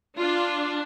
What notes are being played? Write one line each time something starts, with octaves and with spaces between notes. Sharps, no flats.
D4 F4